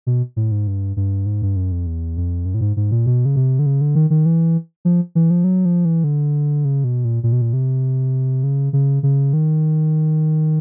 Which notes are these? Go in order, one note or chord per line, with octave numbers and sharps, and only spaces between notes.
B2
A2
G#2
G2
G2
G#2
G2
F#2
F2
E2
F2
F#2
A2
G#2
G#2
A#2
B2
C#3
C3
D3
C#3
D3
D#3
D#3
E3
F3
E3
F3
F#3
F3
E3
D3
C#3
B2
A#2
A#2
B2
A#2
C3
C#3
C#3
C#3
D#3